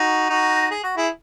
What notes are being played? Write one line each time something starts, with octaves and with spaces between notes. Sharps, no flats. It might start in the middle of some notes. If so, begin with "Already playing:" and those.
Already playing: D#4 F#4
D#4 F#4
G#4
F#4
E4 G#4